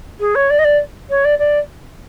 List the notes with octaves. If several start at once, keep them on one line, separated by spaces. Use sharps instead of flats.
G#4
C#5
D5
D#5
D5
C#5
D5
D5